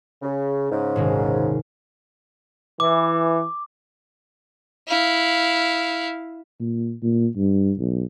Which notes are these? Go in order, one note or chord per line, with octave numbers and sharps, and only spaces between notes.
C#3
G#2 C#3
D#1 G#1 C3
E3 D6
E4 F5
A#2
A#2
G2
B1